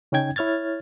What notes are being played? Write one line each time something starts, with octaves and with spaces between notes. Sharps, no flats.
C#3 C#4 D#4 G5 G#6
E4 C#5 F6 G#6 A6